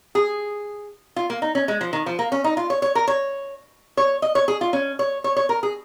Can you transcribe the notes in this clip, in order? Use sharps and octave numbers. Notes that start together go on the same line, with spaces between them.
G#4
F4
A#3
D#4
C#4
G#3
F3
D#3
F3
A#3
C#4
D#4
F4
C#5
C#5
A#4
C#5
C#5
D#5
C#5
G#4
F4
C#4
C#5
C#5
C#5
A#4
G#4